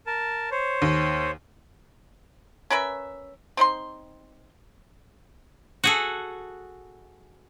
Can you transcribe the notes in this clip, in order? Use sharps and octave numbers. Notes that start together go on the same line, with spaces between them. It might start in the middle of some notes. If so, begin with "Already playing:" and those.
A#4 A5
C5 C#5
D#2
C#4 A#4 B4 E5
C4 D#4 D#5 C6
F#4 G#4 A4